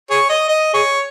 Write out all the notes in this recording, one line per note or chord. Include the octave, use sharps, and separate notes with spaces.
G#4 C#5
D#5
D#5
G#4 C#5